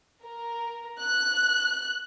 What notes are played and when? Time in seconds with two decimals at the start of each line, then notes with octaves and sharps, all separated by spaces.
0.21 A#4
1.01 F#6